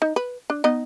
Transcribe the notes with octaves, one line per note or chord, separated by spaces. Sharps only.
D#4
B4
D4
B3 D#4 D#5